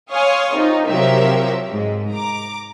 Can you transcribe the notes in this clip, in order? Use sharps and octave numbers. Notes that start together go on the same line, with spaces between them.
C#5 F5 G#5 C6 C#6 D#6
C3 D#4 F4 G4
C3 F3 F#3 G4 A#4 E5
G#2
A#5 D6